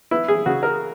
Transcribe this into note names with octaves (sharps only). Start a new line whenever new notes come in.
B3 E4
G#4
C#3 F#4
A#4